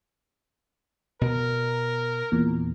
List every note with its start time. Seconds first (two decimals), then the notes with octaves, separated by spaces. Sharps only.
1.21 B2 B3 A#4
2.32 E2 A#2